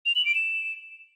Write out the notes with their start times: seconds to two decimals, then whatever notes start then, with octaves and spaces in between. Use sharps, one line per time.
0.06 F7
0.15 F#7
0.25 D7
0.35 E7